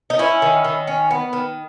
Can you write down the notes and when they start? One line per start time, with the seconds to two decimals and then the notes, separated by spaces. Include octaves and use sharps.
0.10 D#4
0.19 C#4 E4
0.42 D#3
0.64 D#3
0.87 C#4
1.11 B3
1.33 D#3